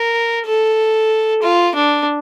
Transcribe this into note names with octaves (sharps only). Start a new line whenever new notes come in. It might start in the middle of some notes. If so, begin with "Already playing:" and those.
Already playing: A#4
A4
F4
D4